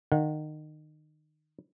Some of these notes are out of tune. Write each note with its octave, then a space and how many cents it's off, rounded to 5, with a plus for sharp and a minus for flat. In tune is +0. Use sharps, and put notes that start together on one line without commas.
D#3 -25 F#5 -45